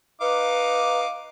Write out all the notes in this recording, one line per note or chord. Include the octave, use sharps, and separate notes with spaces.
D#4 B4 F5 D6